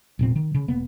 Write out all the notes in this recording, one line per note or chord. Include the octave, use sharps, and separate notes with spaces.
E1 A#2 C4
D#3
C#3
E1 A#3 B3